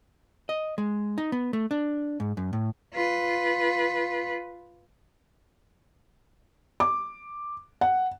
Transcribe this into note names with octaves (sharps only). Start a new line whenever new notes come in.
D#5
G#3
D#4
B3
A3
D4
G#2
F#2
A2
F4 B4
D6
F#5